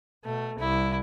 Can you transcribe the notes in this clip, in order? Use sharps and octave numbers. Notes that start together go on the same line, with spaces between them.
B2 A3
C2 E4